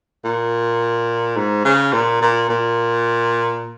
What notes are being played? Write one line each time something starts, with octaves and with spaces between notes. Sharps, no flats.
A#2
G#2
C#3
A#2
A#2
A#2